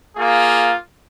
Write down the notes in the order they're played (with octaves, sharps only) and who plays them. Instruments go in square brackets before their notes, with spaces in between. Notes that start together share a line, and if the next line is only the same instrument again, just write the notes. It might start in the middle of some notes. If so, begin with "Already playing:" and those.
[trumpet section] A#3 F4 G#4